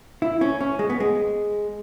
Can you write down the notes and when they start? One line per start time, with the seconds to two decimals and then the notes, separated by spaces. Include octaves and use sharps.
0.22 E4
0.41 C#4
0.61 C#4
0.79 G#3
0.90 B3
1.00 G#3